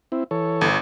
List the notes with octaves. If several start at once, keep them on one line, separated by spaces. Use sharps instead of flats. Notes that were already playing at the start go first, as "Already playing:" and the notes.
C4 E4
E3 A4 C#5
G1